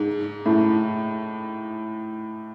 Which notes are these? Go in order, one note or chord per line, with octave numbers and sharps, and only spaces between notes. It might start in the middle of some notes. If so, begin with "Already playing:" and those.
Already playing: G#2
A2